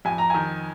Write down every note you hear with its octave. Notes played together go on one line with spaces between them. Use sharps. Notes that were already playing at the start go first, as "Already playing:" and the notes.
F2 G#5
A#5
D#3 G#5